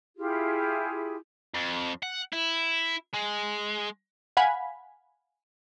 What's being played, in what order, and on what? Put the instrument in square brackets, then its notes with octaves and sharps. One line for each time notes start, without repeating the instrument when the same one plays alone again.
[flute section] E4 F4 G4 G#4
[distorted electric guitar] F2
F#5
E4
G#3
[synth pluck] F5 F#5 G#5 B5 B6